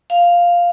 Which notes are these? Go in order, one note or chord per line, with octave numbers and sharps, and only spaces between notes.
F5